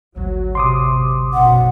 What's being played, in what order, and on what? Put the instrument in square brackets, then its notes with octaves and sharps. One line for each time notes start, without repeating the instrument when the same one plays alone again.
[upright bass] G#1 D2 [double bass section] F#3
[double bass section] C3 [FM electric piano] C6 D6 D#6
[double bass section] B1 F#2 [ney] F#5